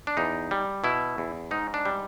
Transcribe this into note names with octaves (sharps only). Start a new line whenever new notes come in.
D4
E2 D#4
G3
B2 E4
E2
G#2 D#4
D4
G3